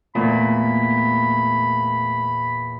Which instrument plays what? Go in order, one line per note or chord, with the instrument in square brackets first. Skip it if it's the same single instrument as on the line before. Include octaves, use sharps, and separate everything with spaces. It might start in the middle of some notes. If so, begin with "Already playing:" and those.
[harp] E2 A#2 [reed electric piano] A3 [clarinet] B5